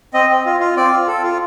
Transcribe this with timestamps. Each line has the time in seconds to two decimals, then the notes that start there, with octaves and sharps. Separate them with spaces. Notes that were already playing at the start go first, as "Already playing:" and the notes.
0.14 C4 D#5
0.30 C4
0.46 F4
0.60 F4
0.77 C4 D5
0.93 F4
1.07 A4
1.23 F4